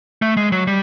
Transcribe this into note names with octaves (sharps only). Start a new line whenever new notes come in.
A3
G#3
F#3
G3